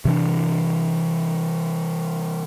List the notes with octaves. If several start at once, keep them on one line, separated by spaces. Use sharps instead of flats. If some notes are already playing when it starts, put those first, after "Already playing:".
C3 E3 D4